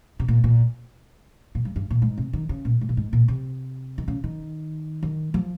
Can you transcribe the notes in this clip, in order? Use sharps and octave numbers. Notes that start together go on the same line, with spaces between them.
C3
A#2
A#2
A#2
G2
G2
A#2
G#2
C3
D#3
C#3
A#2
G#2
A#2
G#2
A#2
C3
D#3
C#3
D#3
D#3
F3